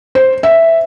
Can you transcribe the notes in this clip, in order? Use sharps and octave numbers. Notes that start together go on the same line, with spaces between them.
C5
E5